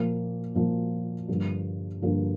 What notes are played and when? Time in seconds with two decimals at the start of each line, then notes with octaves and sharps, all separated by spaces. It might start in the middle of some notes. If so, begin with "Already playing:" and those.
Already playing: A#2 F3 A#3
0.55 A#2 F3 A#3
1.28 G2 D3 F3 A#3
2.02 G2 D3 F3 A#3